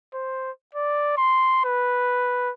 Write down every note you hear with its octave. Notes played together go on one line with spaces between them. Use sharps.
C5
D5
C6
B4